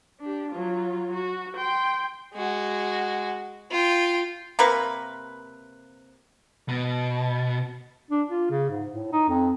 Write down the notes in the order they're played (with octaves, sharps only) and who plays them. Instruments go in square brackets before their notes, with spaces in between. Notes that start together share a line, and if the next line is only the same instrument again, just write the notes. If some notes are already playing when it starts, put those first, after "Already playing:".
[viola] D4 G4
F#3 F4
F#4
G5 C6
[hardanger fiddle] G#3 F#4
F4 G5
[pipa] C3 A#3 A#4 B4
[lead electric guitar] B2
[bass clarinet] D4
F4
C#3
G#2
A2
D#4
F2